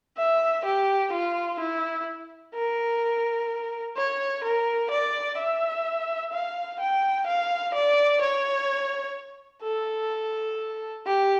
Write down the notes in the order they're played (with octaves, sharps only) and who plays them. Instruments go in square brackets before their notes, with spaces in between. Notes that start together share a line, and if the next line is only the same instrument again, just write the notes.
[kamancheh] E5
G4
F4
E4
A#4
C#5
A#4
D5
E5
F5
G5
F5
D5
C#5
A4
G4